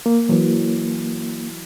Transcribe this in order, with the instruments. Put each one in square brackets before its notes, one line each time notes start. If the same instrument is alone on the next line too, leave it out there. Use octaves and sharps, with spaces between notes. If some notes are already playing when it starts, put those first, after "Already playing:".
[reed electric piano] A#3
[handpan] E3 F#3